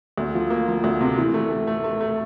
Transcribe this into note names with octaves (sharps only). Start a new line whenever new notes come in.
D2
F3
A#3
F3
D2
C3
E3
A3
A3
A3
A3
A3